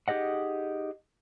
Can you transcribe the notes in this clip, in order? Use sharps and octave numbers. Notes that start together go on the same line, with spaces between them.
D#4 G4 G#4 D#5 F#5